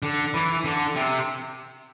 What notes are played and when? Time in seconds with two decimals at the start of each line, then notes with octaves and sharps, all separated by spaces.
0.03 D3
0.34 E3
0.65 D3
0.95 C3